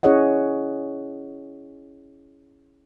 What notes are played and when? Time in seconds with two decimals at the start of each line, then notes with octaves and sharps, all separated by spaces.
0.03 C#4 E4 G#4 C#5 D#5 F#5